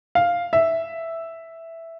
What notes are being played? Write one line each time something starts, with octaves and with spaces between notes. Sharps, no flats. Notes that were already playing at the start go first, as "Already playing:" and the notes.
F5
E5